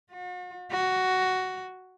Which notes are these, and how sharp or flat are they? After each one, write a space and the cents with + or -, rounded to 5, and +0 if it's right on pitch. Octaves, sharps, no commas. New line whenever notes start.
F#4 -45
F#4 +10